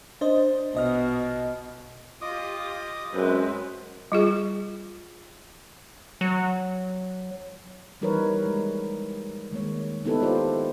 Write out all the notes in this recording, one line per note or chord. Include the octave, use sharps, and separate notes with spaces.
D4 C5 D#5
A#1 B2 D#5 F6
F4 G4 D#5 D6 D#6
F#2 G#3 C4 B4
G3 F4 G#4
F#3
E3 G3 D#4 A#4 B4 C#5
G#3
D#3 G#3 A#3 C#5
B3 D#4 E4 G4 A4 B4
F4 G4 C5 D5